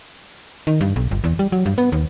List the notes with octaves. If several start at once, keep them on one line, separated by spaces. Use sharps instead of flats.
D#3
G2
B1
G1
E2
G3
F#3
G2
B3
D#2